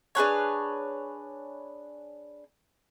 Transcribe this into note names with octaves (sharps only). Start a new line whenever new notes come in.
D4 G#4 B4 C#5